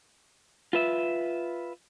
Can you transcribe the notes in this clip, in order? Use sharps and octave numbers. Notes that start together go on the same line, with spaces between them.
F4 B4 E5